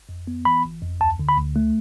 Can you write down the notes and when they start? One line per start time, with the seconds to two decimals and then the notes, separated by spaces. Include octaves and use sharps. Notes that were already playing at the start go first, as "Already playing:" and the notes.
Already playing: G1
0.09 F2
0.27 B3
0.45 E3 B5
0.64 G1
0.82 F2
1.01 D2 A5
1.19 D3
1.29 B5
1.37 D2
1.56 A3